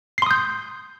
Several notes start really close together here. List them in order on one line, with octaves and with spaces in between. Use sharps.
C7 C6 D#6 G6